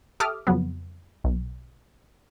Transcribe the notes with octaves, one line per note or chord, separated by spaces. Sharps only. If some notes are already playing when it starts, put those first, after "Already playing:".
G4 A4 E5 D6 D#6 F6
F2 C#3 F#3 B3
B1